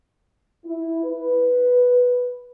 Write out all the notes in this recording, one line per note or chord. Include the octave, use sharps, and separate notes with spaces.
E4
B4